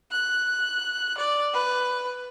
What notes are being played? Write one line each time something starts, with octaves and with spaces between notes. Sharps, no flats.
F#6
D5
B4